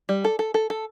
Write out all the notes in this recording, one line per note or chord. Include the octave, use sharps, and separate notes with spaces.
G3
A4
A4
A4
A4